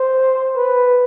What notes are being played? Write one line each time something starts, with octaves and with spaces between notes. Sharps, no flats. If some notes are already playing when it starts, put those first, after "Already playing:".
Already playing: C5
B4